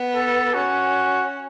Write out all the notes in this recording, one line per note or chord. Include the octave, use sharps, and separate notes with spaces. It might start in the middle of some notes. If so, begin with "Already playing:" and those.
Already playing: B3
A4
C#4 F#4